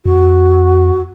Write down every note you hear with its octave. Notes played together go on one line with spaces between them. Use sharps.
F2 F#4